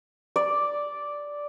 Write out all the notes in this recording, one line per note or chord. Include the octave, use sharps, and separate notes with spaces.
D5